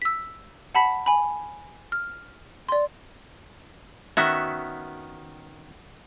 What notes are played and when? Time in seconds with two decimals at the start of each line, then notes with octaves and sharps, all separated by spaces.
0.02 E6 B6
0.75 F#5 A5 B5 B6
1.06 G#5 B5
1.92 F6
2.69 D5 C6
4.17 D#3 B3 C#4 F#4 E5